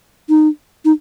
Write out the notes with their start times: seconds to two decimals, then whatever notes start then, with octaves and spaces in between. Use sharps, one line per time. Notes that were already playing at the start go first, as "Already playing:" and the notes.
0.29 D#4
0.85 D#4